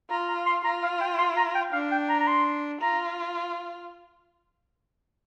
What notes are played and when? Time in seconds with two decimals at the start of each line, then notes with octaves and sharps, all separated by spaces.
0.10 F4 A#5
0.28 A#5
0.46 C6
0.64 F4 A#5
0.83 F5
1.00 G5
1.18 C6
1.37 A#5
1.55 G5
1.73 D4 F5
1.91 G5
2.09 A#5
2.20 A#5
2.27 C6
2.81 F4 A#5